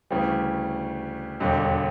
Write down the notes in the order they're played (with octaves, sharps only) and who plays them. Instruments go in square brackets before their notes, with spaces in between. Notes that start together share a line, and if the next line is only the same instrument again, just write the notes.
[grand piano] D2 C#3 E3 G3
E1 D#2 D3 G3